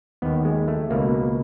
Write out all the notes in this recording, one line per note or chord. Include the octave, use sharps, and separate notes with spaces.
D#2 D#3 B3
G#3
A3
C#2 B2 A#3